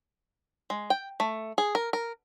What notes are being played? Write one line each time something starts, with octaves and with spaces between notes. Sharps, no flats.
G#3
G5
A3
G#4
A#4
A#4